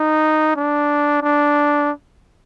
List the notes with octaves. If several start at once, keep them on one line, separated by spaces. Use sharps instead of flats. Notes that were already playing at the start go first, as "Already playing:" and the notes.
Already playing: D#4
D4
D4